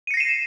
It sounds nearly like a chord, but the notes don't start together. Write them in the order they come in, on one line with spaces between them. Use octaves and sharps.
D#7 C#7 A#6 C7 E7